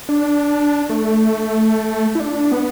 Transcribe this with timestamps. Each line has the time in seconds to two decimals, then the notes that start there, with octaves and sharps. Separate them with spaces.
0.09 D4
0.90 A3
2.15 E4
2.20 D4
2.52 B3